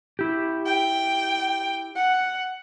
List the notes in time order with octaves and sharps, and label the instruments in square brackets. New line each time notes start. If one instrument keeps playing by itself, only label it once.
[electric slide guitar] E4 G4
[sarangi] G5
F#5